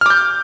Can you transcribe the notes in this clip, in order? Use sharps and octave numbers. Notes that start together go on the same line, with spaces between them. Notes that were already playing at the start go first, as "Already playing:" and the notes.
D6 F6 G6